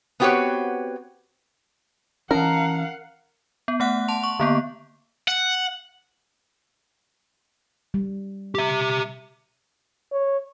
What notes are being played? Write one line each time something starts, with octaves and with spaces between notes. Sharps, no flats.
B3 C4 F#4 G4 B4 C#5
E3 C#4 D#4 A#4 F5 F#5 A5 A#5
B3
A3 F#5 F#6
A5 C6 F7
C#6
D3 A#3 B3
F#5
G3
G4 E5
C#5